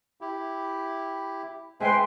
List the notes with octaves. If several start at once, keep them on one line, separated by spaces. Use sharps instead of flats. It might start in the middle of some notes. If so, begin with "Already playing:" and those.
E4 G4
G#3 B4 C5 E5 G5 G#5 C6